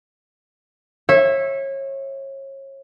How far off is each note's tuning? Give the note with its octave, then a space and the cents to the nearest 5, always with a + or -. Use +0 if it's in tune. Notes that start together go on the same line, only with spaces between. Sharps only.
C#5 -30 E5 +0